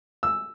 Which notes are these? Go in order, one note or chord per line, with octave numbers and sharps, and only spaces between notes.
E6